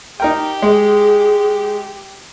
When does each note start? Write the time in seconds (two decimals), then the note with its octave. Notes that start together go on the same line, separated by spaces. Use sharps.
0.20 D#4 G4 A#4 G5
0.62 G#3 G#4